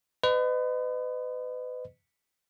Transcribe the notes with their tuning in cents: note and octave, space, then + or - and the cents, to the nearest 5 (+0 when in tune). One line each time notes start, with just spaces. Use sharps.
B4 +35 D#5 -25